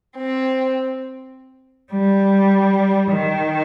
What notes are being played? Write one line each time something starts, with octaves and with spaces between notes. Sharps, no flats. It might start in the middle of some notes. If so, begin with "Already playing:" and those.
C4
G3
D#3